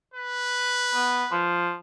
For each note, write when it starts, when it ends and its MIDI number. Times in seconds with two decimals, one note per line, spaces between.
0.14 1.54 71
0.94 1.24 59
1.32 1.75 53